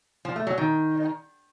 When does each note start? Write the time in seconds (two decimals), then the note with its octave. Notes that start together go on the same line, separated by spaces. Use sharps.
0.25 F3
0.36 A3
0.47 F#3
0.58 D#3